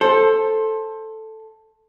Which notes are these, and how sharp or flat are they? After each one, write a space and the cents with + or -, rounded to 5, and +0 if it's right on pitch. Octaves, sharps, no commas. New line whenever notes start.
A4 +0 C5 +20